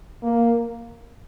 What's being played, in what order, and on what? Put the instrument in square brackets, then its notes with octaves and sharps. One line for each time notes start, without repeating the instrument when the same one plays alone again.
[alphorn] A#3